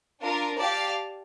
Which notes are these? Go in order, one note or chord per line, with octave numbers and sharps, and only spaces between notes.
D4 F4 A#4
G4 D5 F5 A5